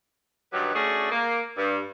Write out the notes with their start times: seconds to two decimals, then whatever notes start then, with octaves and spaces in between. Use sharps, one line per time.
0.53 G2 D#3 F#3 G4 B4
0.75 A3 C#4 D4 F#4 G#4
1.12 A#3
1.57 G2